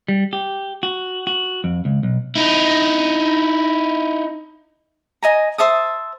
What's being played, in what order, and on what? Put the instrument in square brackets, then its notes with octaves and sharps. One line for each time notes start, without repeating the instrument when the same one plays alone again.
[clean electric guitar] G3
G4
F#4
F#4
F2
C#2
B1
[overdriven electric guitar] D#4 E4
[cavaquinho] D#5 G#5 A#5
C5 E5 A5 D#6